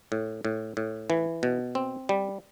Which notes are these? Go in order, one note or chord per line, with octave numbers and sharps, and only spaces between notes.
A2
A2
A2
E3
B2
C4
G3